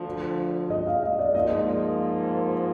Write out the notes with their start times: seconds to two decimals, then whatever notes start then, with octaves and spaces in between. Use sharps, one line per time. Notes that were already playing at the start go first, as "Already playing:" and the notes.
Already playing: D2 D3 F3
0.70 D#5
0.87 F5
1.03 D#5
1.19 D5
1.35 G#2 F3 A#3 D#5